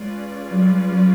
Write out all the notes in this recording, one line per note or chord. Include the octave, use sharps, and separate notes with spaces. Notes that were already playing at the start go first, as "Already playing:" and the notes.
Already playing: G#3 C#4 F4 G#4 B4 D5
F#3
G3
F#3